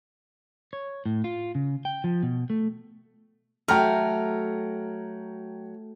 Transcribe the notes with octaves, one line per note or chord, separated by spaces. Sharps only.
C#5
A2
F4
C#3
G5
F3
B2
A3
F#3 A3 G5 A#5 F6